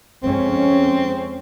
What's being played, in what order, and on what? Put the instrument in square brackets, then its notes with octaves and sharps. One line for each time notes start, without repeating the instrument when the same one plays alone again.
[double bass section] F2 G#3 C#4 [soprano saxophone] C4